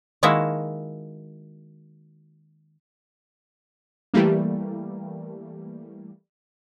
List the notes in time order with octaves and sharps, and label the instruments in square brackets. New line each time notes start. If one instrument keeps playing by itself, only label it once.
[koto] D#3 G#3 A#3 E4 F#4 E5
[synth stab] E3 G3 A3 A#3